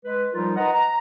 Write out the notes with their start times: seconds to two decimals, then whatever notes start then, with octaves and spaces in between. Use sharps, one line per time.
0.05 G#3 B4
0.32 F3 G3 D#4 F4 A#4
0.56 B4 D#5 F#5 A#5
0.73 A#5